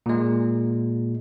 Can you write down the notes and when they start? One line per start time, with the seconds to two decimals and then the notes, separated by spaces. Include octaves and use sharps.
0.06 A#2 G#3